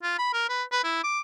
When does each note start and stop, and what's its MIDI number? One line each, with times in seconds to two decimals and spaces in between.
0.03 0.14 65
0.18 0.30 83
0.34 0.46 70
0.49 0.63 71
0.72 0.82 71
0.84 1.02 64
1.04 1.20 86